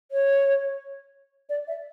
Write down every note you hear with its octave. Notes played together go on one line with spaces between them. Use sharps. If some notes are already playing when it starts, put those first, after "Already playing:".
C#5
D5
E5